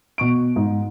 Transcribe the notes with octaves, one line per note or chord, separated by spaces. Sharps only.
B2 C#6 D7
G#2